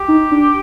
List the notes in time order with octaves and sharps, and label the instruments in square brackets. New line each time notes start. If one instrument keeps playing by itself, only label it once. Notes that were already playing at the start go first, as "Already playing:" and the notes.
Already playing: [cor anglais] G4
[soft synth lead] D#4
D4